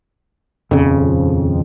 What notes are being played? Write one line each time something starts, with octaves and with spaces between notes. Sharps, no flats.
D#1 F2 C#3